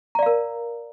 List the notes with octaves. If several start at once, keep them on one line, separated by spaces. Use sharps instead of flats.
A#4 D5 F5 A#5